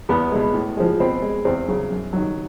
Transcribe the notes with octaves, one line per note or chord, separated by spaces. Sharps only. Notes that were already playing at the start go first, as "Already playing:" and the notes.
E2 B3
B2 G#3
A2
F3 G#3
B2 C4
G#3
E2 C4
C#3 F#3
F#2
D#3 F#3